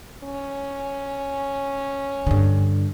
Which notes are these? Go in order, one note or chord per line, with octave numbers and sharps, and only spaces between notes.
C#4
G2 D3